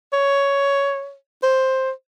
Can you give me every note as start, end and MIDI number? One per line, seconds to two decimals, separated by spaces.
0.13 1.15 73
1.43 1.91 72